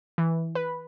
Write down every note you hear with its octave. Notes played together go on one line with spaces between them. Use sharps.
E3
B4